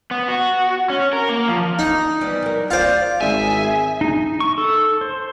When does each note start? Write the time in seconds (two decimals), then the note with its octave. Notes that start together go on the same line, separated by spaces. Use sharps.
0.11 B3
0.28 F#4
0.90 C#4
1.13 A#4
1.29 A#3
1.48 F3
1.79 D#4
2.21 E3 G3 B3
2.42 F#3 A#4
2.70 D2 F4 C5 D5
3.21 G#1 G#4 E5 G#5
4.01 D#4
4.40 C#6
4.58 A4
5.01 C5